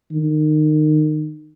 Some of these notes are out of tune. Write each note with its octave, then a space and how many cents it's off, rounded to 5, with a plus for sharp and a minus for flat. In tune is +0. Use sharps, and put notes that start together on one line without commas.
D#3 -25